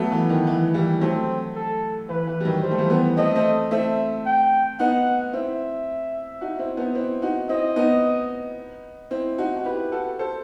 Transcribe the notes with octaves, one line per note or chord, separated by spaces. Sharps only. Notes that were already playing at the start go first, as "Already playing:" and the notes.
Already playing: F#3 A3 B3
E3
D#3
E3
E3 G3
F#3 A3 C4
A4
E3 B4
E3
G3
D#3 F#3
G3 C5
A3
E3 G3
G3 B3
A3 C4 D#5
A3 C4
A3 C4 E5
G5
B3 D#4 F#5
C4 E4 E5
D#4 F#4
C4 E4
B3 D#4
C4 E4
D#4 F#4
C4 E4 D#5
B3 D#4
C4 E4
D#4 F#4
F#4
E4 G4 B4
F#4 A4
A4 C5